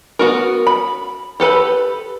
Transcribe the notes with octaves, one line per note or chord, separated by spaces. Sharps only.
B3 F#4 A#4
B5
G4 A4 B4 B5